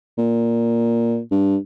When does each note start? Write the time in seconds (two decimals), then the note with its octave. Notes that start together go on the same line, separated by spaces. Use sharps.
0.18 A#2
1.31 G2